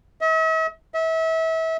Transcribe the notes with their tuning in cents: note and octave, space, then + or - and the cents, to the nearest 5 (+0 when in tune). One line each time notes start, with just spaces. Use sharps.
E5 -45
E5 -30